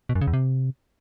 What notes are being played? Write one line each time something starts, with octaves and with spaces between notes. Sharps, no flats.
B2
F#2
C#3
E2
C3